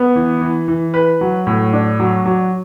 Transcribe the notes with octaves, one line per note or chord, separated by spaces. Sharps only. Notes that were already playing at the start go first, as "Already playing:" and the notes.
Already playing: B3
E3
E3
E3
B4
F#3
A2
D4
F#3
F#3